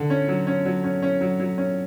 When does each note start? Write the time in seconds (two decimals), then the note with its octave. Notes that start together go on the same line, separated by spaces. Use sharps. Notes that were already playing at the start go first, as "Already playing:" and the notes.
Already playing: D3
0.10 C#4
0.28 F#3
0.47 C#4
0.65 F#3
0.84 C#4
1.02 C#4
1.21 F#3
1.40 F#3
1.58 C#4